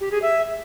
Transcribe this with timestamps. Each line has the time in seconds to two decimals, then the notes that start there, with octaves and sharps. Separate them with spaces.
0.01 G4
0.11 G#4
0.22 E5